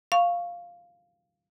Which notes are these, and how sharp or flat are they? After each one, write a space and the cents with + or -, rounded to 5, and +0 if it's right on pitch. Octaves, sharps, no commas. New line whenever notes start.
F5 +0 C#6 +0